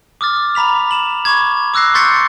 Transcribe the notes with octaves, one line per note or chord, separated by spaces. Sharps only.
D6 D#6 F6 A6
A#5 B5 B6 F7
E7 F#7
B5 C#6 D6 G#6
D6 E6 F#6 A#6 C7
C6 C#6 G6 A6 B6 C#7